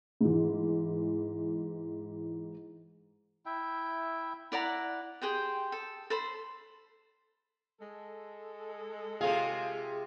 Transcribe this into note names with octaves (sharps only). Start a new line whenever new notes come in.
G#2 E3
E4 E5 G5
E4 D5 F#5 A#5
G4 G#4 C5 G5
A4
A4 C5 B5
G#3 A4
C3 F4 G#4 F5